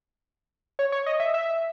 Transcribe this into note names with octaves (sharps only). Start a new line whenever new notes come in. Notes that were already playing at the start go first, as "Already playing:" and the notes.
C#5
C#5
D#5
E5
E5